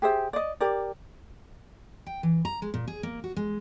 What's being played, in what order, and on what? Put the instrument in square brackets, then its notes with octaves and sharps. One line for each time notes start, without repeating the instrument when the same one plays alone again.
[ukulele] G4 G#4 C5 E5
D5 D#5
G4 A#4 D5
[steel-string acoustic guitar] G5
E3
A#5
G#3
A#2
G#4
A#3
F#4
G#3